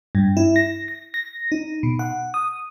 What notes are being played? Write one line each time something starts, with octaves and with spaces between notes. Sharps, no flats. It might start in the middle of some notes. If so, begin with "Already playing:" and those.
G2
E4
A#6
A#6
A#6
D#4
B2
F#5
D#6